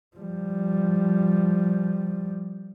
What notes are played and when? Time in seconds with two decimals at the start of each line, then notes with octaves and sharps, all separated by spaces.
0.17 F3 G3